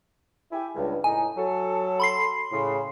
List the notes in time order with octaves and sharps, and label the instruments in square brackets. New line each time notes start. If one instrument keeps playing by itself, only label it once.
[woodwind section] E4 G4 G#5
C#2 G2
[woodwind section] A2 D#4 [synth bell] G#5
[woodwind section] F#3 A4
[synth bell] B5 C6 C7
[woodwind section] A2 C#3